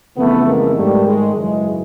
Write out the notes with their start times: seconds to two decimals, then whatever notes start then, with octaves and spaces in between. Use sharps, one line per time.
0.17 F2 C#3 E3 A3 B3
0.47 G#3 A#3
0.76 G#2 D#3 G3 A3
1.06 G#3
1.35 F#2 C#3 E3 G#3